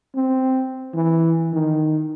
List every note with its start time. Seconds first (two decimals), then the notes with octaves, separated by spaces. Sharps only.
0.16 C4
0.94 E3
1.53 D#3